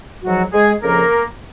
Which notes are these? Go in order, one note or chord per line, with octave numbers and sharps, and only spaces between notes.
G#2 F3 F#3 F#4
G#3 G#4
F2 C#3 F3 A#3 A#4